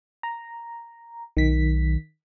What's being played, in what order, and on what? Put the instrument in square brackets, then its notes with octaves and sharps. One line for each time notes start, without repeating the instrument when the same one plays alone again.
[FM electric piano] A#5
[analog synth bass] B1 [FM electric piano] D#3 B6